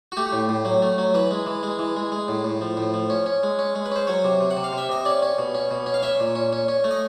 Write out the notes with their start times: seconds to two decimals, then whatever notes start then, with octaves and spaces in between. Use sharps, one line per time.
0.12 F#4
0.17 A3 G4
0.33 A2
0.49 A2
0.65 F#3
0.82 A3
0.98 F#3
1.14 E3 B4
1.31 G#3
1.46 E3
1.63 G#3
1.79 E3
1.97 G#3
2.12 G#3
2.28 A2
2.44 A2
2.61 F3
2.77 A2
2.94 F3
3.10 C#4
3.26 C#4
3.43 G#3
3.59 C#4
3.75 G#3
3.85 B4
3.92 C#4 C5
4.07 F#3 C#5
4.24 C3
4.41 C3
4.51 F#5
4.57 C3
4.64 F5
4.73 C3
4.78 E5
4.89 C3 D#5
5.05 C#4 D5
5.22 C#4
5.38 B2
5.55 C#4
5.71 B2
5.86 C#4
5.94 F5
6.03 C#4 E5
6.20 A#2
6.35 C#4
6.53 C#4
6.68 C#4
6.84 A3
6.91 D#5